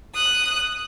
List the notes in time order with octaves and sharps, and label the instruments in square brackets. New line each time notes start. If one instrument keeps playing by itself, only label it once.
[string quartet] D#6 F#6